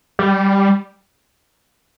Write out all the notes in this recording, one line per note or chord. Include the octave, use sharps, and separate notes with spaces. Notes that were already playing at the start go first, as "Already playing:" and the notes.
G3